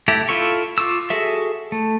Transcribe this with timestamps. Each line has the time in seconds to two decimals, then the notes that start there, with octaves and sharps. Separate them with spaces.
0.08 A3 E4 G4
0.29 E4 F4 A4 C#6
0.78 F4 C#6 D6 E6
1.10 F#4 G#4 A4 E5
1.72 A3